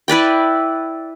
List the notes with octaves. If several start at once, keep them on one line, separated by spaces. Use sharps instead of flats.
E4 B4 D5 G5